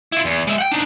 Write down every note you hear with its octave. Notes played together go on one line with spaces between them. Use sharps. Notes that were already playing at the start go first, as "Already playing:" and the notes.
E4 F4
E2
G#3 E5
F#5 G5
D4 D#4